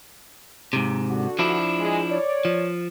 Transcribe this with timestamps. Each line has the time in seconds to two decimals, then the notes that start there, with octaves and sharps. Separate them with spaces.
0.73 G#2 C3
1.09 D3 F#4
1.39 F3 D4 E4
1.79 G#3
2.10 C#5 D5
2.45 F3